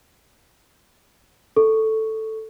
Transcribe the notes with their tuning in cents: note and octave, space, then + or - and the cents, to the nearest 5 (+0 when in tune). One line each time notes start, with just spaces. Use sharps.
A4 +0 C#6 +0